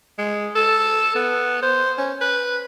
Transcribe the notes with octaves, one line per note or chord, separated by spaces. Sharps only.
G#3
A4
B3
C5
C#4
B4